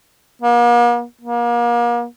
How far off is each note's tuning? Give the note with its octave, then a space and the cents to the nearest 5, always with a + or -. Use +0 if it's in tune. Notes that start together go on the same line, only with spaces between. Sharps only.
A#3 +45
A#3 +35